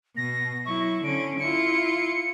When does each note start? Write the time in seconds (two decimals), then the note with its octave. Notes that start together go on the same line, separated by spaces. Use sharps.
0.17 B2 A#6
0.66 F#3 E4 C#6
1.04 D3 C#4 D7
1.40 E4 F4 C#7